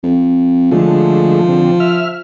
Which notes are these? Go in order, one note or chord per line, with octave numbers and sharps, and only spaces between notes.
F2
D3 F3 G#3 A3
D3 C4
E5 F6